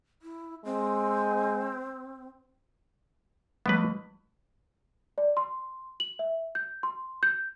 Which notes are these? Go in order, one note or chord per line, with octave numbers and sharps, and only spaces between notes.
E4
G#3 C4
F3 G3 A3 B3 B4
D5
C6
F#7
E5
G6
C6
G6